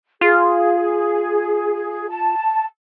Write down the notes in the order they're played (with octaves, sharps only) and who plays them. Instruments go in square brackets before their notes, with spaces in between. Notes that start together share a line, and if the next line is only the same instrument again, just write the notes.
[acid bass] F4 [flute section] G#4
[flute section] A5